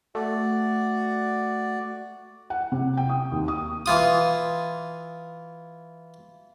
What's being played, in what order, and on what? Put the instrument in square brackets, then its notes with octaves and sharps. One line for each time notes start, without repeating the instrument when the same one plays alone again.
[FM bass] A3 [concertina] F#4 D5
[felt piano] F#5
C3
G5
D#6
D#2
D#6
[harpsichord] E3 F4 D#6